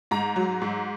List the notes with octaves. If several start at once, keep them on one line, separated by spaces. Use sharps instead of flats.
G#2 A#5
F#3
G#2